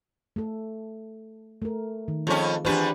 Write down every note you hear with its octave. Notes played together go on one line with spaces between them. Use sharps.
A3 A4
A3 A#4
D#3
F2 C4 C#4 F4 G#4
E2 D4 G4 B4 C5